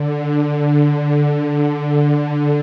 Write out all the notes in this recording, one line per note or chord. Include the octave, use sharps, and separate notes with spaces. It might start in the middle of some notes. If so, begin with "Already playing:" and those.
Already playing: D3
D3